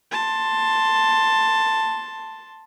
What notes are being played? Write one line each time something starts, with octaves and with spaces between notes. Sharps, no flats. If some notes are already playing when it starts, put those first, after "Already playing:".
A5 C6